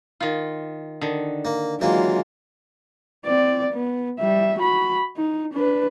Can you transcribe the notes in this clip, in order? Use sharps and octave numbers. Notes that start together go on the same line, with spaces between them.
D#3 F4
D3 D#3
A#3
E3 F#3 G#3 A#3 F4
C4 D5
B3
G3 E5
F#4 B5
D#4
D4 B4